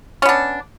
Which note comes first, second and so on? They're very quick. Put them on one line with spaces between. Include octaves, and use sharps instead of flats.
C#4 B3 D4